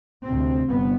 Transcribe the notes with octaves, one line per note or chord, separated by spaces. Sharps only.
D2 C3 C4
G1 B3